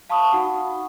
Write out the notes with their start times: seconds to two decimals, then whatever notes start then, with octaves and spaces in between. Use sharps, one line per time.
0.10 F5 A5 B5 C#6 D#6
0.33 D#4 F#4 F#5